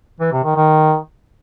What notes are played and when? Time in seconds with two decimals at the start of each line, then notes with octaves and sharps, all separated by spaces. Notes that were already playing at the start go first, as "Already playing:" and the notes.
0.20 E3
0.32 C3
0.44 D#3
0.56 D#3